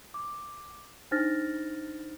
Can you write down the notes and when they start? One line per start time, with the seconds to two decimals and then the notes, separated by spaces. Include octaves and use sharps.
0.14 D6
1.11 D4 D#4 C5 F6 A6 A#6